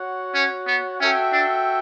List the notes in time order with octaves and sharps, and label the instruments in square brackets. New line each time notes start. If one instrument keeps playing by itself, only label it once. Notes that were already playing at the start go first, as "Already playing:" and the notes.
Already playing: [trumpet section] F#4 C#5 F#5
[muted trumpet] C#4
B3
[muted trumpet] C#4 [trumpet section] F#4 A4 E5 G5
[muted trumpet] D4